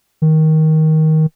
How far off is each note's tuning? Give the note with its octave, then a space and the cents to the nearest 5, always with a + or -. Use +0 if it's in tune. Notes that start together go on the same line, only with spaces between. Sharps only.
D#3 +15